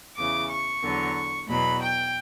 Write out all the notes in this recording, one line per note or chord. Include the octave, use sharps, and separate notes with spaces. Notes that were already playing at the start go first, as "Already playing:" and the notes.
E2 C#3 E3 D6
C#6
E2 D3 F#3
E2 B2 F#3 B5
G5